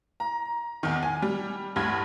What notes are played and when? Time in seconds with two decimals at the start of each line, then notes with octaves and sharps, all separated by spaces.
0.20 A#5
0.83 E2 D#3
1.03 G#5
1.22 G3
1.76 D2 G2 B5 G#6